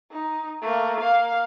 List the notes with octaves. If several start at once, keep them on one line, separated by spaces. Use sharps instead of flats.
D#4
A3 A#3
A#3 F5